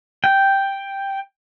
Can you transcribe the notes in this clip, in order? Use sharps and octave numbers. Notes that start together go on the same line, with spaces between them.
G5